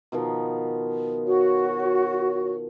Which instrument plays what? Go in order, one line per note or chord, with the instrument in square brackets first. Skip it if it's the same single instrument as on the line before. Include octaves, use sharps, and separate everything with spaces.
[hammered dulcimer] B2 D#3 F3
[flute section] F#4 C#5